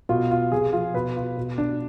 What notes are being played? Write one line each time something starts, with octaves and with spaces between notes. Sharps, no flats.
B2 F4
F4
C3 G#4
F3 F4
B2 B4
F4
B2
D4